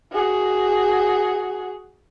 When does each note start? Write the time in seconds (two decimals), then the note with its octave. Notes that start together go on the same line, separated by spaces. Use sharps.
0.13 F#4 G#4